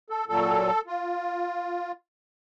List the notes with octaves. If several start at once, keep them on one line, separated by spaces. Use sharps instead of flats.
A4
A#2 F#3 A4
F4